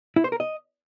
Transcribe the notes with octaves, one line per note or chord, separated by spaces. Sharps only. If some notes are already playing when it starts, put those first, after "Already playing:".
E4
C5
A#4
D#5